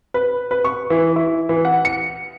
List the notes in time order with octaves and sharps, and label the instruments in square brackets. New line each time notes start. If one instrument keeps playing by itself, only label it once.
[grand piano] B4
B4
C#6
E3
E4
E3
F#5
C#7